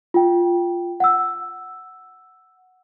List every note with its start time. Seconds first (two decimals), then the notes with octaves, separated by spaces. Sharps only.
0.14 F4 G5
1.00 F#5 E6